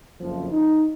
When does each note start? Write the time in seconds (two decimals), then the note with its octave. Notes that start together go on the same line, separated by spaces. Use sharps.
0.19 F#1 F2 F3
0.50 D#4